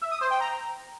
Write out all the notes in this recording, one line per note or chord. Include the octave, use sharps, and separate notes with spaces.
E5
D#6
C5
G5
A#5